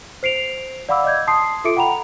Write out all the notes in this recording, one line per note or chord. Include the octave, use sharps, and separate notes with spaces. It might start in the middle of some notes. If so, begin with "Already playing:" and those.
C5 C7 D7 F7
D5 F5 F#5 B5 D6 E6
D#5 D6 G6 G#6
A5 C6 D#6 C7
F4 A4 E5 D6 C#7 D7
F#5 G5 A#5 B5 F7